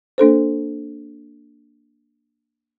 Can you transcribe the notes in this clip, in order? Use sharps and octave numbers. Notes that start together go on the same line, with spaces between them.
A#3 D4 A4 C5